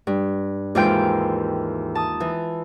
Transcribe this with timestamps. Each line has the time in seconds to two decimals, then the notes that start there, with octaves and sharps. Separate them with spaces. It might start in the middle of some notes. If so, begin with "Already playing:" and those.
0.07 G2
0.75 D#2 G#2 E3 F4 G5 G6
1.95 A5 D#6
2.20 E3